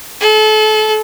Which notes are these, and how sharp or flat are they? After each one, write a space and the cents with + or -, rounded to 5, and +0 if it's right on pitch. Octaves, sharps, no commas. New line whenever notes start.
A4 -30